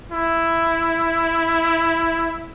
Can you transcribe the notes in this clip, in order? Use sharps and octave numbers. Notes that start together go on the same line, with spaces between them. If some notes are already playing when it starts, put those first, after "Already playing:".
E4